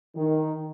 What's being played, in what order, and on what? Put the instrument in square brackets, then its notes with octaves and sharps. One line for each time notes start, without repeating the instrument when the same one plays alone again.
[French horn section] D#3